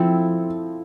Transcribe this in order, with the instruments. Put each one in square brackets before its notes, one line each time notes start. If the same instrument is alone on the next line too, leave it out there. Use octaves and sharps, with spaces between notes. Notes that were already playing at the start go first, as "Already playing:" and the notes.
Already playing: [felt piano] F3 [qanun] C4 E4 A4